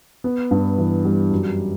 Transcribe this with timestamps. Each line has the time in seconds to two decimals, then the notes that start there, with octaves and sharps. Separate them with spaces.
0.24 B3
0.51 G2
0.78 E3
1.05 G3
1.31 F#2